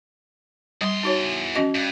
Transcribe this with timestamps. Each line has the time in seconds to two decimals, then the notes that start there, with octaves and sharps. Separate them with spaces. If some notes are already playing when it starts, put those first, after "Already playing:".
0.81 E2 G3 C6
1.03 D#4 F#4 C#5
1.55 C#4 F#4 D#5
1.75 G2